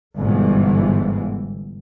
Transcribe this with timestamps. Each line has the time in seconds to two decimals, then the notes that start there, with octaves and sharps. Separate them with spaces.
0.18 G1 G#2 B2 E3